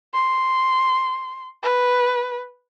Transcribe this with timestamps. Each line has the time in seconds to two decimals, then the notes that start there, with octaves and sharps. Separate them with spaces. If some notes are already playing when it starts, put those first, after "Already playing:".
0.14 C6
1.63 B4